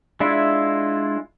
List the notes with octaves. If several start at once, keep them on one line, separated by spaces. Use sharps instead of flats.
G#3 D4 E4 F4 E5